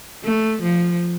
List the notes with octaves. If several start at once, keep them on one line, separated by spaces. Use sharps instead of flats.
A3
F3